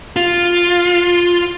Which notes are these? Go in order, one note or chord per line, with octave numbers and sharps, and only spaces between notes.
F4